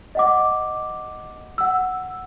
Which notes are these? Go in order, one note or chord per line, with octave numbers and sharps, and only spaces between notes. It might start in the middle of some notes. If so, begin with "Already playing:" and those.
D#5 F#5 D6
F#5 E6